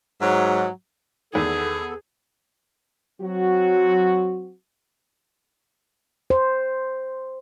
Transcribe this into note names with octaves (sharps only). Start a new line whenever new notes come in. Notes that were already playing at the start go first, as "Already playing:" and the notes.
G#2 F#3
E2 D#3 B3 G#4 A4
F#3 C4 F#4
C5